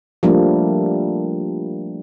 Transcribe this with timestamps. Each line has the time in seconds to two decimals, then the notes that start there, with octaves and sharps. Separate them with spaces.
0.23 F3 G3 A3 A#3 D4